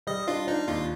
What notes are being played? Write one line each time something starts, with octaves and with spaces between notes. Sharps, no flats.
G3 D#5
D4 F4
D4 D#4
D#2 F4